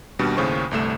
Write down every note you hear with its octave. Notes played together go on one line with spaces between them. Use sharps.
D#2 B2 G3 D4
D#2 A2 C#3 C5 C#6
G1 C2 A3 E7